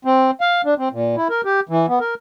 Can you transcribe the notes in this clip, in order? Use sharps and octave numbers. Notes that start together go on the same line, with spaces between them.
C4
F5
D4
C4
A#2
E4
A#4
G4
E3
B3
A#4